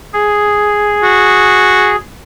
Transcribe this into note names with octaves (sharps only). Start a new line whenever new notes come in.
G#4
F#4